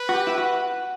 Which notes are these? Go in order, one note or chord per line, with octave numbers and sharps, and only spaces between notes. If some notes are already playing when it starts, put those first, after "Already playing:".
Already playing: B4
F#4
G4
E4
F#4